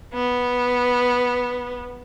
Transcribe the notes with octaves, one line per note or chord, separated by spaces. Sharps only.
B3